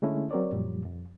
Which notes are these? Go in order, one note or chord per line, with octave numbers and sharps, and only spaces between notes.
D3 G#3 A3 C#4 E4
F#3 C4 A#4 C#5 D5
F#2 A#2 F3 G3
F2